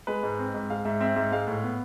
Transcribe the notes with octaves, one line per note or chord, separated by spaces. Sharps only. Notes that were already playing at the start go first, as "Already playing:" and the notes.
G#3 B4
G#2
C4
G#2
G#3 F5
G#2 E5
C4 E5
G#2 E5
G#3 F5
A2
B3